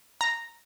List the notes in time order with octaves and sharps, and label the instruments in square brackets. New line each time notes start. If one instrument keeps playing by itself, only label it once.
[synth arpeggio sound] A#5